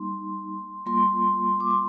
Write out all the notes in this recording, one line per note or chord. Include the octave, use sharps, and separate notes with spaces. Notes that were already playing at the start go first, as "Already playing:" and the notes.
Already playing: G3 A#3 D#4 C6
G3 A#3 F4 C6
D6
C6